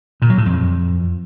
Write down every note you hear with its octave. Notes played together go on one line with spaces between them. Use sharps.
A#2
F#3
A2
F2